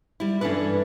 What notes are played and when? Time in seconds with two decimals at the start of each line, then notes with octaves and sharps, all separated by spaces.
0.20 G3 E4
0.41 G2 E3 C#4 D4 A4 B4